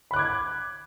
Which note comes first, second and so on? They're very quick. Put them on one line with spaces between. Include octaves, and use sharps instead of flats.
B5 F#6 D6 G#6